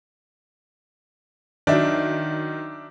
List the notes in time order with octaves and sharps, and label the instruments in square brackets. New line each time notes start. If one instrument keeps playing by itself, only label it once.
[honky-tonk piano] D#3 F#3 [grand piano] D4 E5